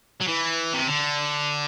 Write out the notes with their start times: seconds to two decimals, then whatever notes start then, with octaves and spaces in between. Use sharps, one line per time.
0.21 F#3
0.28 E3
0.74 C3
0.87 D3